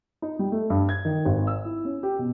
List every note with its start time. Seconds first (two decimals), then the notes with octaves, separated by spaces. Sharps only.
0.22 D#4
0.39 G3
0.52 A3
0.70 G2
0.89 G#6
1.05 D#3
1.25 G#1
1.47 E6
1.65 E4
1.85 C#4
2.03 G4
2.19 B2